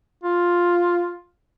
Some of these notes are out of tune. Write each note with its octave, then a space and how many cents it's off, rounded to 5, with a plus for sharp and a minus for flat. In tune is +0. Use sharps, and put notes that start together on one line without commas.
F4 +5